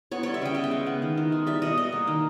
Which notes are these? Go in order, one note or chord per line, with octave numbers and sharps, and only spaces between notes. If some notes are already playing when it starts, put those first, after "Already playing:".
B3 C#5
G3 C#5
E5
C#3 G5
B3 E5
G5
G#3
B3
D#3
D#3
G#3
G3 E5
B2 D#5
B2 D#5
A#3
D#3